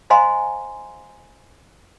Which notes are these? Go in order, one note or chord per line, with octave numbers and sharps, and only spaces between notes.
C5 D#5 F5 G#5 A#5 C6